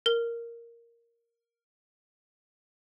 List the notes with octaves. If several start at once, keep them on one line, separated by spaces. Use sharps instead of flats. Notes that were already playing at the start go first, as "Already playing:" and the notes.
A#4 G7